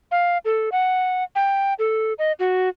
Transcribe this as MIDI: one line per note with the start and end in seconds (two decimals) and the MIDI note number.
0.11 0.38 77
0.45 0.70 69
0.72 1.24 78
1.35 1.74 79
1.79 2.13 69
2.19 2.32 75
2.39 2.69 66